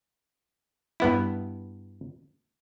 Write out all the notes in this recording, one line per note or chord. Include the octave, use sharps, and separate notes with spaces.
G2 B3 E4